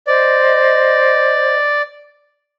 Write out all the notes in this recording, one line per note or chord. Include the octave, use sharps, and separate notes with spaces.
C5 D5 D#5